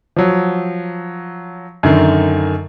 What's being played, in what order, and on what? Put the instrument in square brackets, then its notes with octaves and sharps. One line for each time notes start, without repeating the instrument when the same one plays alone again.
[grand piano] F3 F#3
F#2 D3 D#3